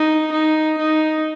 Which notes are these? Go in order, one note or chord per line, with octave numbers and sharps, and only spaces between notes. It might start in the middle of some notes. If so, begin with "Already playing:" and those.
Already playing: D#4
D#4
D#4